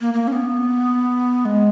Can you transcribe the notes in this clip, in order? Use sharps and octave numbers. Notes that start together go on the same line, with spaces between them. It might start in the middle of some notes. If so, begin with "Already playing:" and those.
A#3
A#3
C#4
B3
G#3